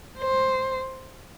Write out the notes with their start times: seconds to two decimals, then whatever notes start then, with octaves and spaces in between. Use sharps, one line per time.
0.19 C5